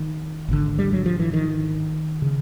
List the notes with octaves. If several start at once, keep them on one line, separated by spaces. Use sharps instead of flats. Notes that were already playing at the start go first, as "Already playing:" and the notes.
Already playing: D#3
G#1 G2 D3
G3
F#3
F3
E3
D#3
C#3